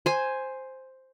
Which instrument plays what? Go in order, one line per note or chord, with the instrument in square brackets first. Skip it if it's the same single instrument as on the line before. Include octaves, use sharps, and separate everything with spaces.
[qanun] C5 G#5